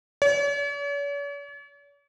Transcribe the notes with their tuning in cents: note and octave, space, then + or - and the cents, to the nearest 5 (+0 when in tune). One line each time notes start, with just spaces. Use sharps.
C#5 +45